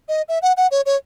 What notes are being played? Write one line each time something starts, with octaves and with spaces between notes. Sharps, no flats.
D#5
E5
F#5
F#5
C#5
C#5